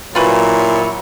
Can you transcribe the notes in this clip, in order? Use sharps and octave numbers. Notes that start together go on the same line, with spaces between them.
A#2 F#3 E4 F4 B4 C#5